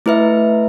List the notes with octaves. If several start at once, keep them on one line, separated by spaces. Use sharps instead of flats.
A3 E4 B4 E5